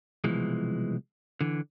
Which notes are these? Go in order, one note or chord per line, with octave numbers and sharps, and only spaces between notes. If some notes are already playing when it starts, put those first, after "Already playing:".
C2 B2 E3 F3 G#3
D3 E3